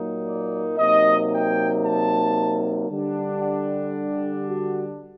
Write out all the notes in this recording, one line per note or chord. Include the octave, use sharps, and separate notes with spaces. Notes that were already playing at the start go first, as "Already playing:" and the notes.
Already playing: A#2 F#3 A#3 D#4
D5
C3 F#3 A#3 D#4 D#5
G5
A5
D3 G3 D4
F#5
G4
F#4